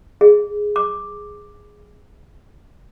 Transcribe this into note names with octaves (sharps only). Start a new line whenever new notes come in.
G#4
D6